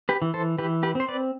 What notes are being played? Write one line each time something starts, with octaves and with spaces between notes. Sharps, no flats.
G4 B4
E3
A4 C5
E3 G4 B4
G4 B4
C4 C5
B4 D5